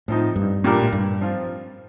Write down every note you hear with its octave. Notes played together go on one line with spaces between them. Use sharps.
A2 F3 C4 D#4
G2
A#2 G3 D4 G4 A#4
A2
G2
F3 C4 F4